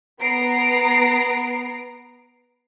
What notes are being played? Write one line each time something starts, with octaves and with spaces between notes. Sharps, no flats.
B3 A#5 C7 D7